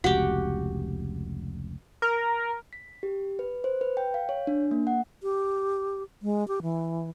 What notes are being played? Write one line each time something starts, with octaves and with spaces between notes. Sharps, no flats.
F1 C#2 F#4 G4
A#4
B6
G4
B4
C5
B4
G5
F5
C#5
D4
A#3
F#5
G4
G#3
G4
E3